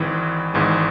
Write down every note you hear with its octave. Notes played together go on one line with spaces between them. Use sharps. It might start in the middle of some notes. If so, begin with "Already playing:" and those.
Already playing: G#1 G#2 E3
G#1 G#2 E3